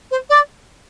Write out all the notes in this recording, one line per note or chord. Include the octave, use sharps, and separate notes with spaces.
C5
D5